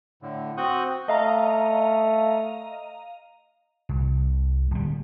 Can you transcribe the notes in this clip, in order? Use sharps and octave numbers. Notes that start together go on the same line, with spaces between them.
A2 D3
C4 F#4 C#6 D#6 F#6 G6
A3 D#5 F5 A#5
C2
D1 G3